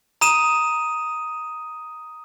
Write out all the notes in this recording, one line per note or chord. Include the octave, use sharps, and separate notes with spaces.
A#5 D#6 D#7 E7